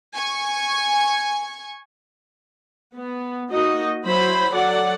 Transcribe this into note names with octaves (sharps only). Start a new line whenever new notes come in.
G#5 C#6
B3
A#3 D#4 F#4 D#5
F#3 E4 C5 B5
F#3 A4 D5 F#5